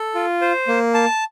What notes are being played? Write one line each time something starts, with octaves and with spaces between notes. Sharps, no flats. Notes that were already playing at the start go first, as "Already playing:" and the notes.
Already playing: A4
F4
C5
A#3
A5